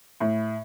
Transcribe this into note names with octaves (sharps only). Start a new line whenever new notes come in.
A2